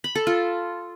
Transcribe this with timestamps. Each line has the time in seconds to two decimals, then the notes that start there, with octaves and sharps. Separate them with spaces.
0.04 B5
0.15 A4
0.27 F4